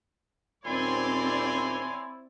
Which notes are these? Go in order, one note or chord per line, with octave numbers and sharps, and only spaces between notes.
D#1 C4 E4 C#5 D5 G#5 C6